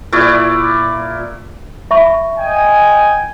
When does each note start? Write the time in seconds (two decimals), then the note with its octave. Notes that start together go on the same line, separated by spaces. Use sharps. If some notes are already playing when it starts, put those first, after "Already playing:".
0.12 A#2 E4 D5 C#6
1.91 E5 B5 C#6
2.38 D#5 G5 G#5